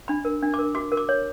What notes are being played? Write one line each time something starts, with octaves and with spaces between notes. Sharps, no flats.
D4 B5
A#4
D4
A#4 D6
F#4 D6
A#4
D6
C#5